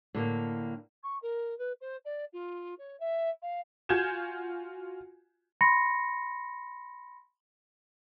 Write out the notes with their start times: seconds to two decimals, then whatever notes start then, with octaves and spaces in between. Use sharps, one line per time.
0.15 A2 D3 A#3
1.04 C#6
1.22 A#4
1.59 B4
1.81 C5
2.05 D5
2.33 F4
2.79 C#5
3.00 E5
3.42 F5
3.89 F4 F#4 G#5 G6 G#6 E7
5.61 B5 C6 A#6 C#7